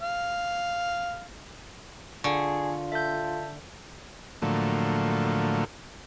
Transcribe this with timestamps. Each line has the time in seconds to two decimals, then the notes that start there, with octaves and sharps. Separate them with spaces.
0.01 F5
2.24 D3 F4 G#4 C#6
2.92 A4 E5 G6
4.42 A2 D3 F3 F#3 A3 A#3